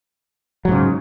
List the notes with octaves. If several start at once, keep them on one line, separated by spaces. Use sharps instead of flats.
G#2 C#3 F#3